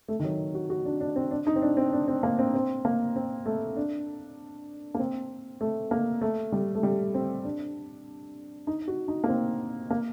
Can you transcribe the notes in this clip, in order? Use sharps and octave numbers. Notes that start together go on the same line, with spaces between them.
A3
D#3
F#3
F#4
F#4
D4
D4
C4
D4
D#4
C4
D4
C4
D4
C4
A#3
C4
C4
A#3
C4
A3
D4
A#3
C4
A3
A#3
A3
G3
A3
G3
C4
D4
D#4
F#4
D#4
A#3
C4
A#3